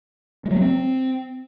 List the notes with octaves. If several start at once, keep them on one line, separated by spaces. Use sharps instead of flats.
G#3
F#3
A#3
C4